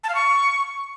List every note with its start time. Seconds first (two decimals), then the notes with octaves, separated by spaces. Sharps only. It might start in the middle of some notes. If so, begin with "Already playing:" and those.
0.04 A5
0.09 F5
0.15 C#6